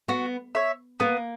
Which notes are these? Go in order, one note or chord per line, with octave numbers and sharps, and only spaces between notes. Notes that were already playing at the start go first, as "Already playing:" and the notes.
B3 F#4
C#5 E5
A#3 B3